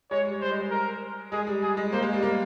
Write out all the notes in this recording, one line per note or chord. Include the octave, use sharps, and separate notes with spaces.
G#3 C#5
G3
G3 C5
G#3
G#3
A#4
G#3 G#4
G3
G3 G#4
G#3
A#3 C5
G#3
G3
A#3